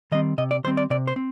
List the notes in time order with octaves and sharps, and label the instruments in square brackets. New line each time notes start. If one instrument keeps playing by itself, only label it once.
[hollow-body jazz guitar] D#3 G3 C4 D#5
C3 D#5
D5
D#3 G3 C4 C5
D5
C3 D5
C5
C4